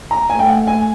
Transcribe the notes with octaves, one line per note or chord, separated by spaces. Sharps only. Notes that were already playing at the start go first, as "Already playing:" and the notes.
A#5
A3 G#5
G5
F#5
G#5